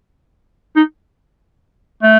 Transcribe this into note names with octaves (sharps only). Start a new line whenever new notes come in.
D#4
A3